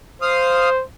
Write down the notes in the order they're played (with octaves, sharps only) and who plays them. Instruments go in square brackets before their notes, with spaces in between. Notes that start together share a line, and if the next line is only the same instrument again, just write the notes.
[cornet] C5 [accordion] F5 D#6